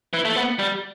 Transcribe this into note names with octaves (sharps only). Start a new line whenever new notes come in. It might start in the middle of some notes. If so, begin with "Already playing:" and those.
E3
A3
B3
G3